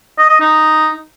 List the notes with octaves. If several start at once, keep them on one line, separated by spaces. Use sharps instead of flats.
D#5
D#5
D#4